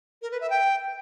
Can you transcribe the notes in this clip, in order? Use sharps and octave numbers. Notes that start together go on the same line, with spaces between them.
A#4
B4
E5
G5